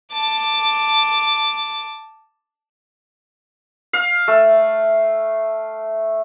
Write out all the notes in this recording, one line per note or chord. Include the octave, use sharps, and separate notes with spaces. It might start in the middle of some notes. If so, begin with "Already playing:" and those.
A5 D6
F5
A3